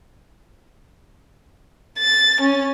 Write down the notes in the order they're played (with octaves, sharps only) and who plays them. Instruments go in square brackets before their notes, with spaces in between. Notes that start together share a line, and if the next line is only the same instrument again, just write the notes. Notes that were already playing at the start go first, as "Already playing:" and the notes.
[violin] A6
C#4